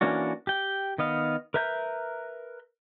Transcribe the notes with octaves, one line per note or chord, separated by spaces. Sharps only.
E3 A#3 C#4 D4 F#4
G4 G5
D#3 B3 D#5 F5
A#4 B4 E5 A#5 G6